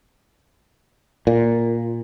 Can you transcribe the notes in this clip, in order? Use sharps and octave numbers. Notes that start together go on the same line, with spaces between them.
A#2